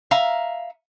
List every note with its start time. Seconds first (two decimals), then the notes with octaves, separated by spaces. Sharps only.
0.11 E5 F5 A#5